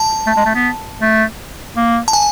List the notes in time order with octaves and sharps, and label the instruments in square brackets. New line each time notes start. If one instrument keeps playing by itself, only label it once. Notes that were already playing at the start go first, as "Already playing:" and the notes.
Already playing: [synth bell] A5
[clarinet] A3
G#3
A3
B3
A3
A#3
[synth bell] A5
G#5